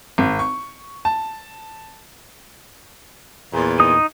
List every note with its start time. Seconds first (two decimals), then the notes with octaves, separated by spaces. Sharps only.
0.18 G#1
0.39 C#6
1.05 A5
3.53 E2 A#2
3.80 D#4 D#6